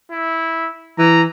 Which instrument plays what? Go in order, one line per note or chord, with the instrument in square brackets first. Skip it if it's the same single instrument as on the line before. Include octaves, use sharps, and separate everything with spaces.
[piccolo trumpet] E4
[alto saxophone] E3 [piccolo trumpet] A#5